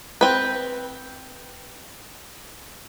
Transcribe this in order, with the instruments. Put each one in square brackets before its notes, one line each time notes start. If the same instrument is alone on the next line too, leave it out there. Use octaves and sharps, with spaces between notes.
[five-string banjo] C4 B4